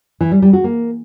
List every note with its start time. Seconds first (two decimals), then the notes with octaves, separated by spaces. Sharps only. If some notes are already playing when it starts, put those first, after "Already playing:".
0.21 E3
0.31 G3
0.42 G3
0.53 F#4
0.64 A#3